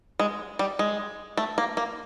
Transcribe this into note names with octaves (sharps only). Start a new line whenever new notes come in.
G#3
G3
G#3
A3
A#3
A#3